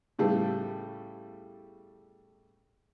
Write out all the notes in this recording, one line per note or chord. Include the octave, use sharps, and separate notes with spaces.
A2 C#3 G3 A3 B3